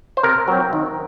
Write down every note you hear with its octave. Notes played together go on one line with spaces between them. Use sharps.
C5
C3 A#4
F#3 C4
D#3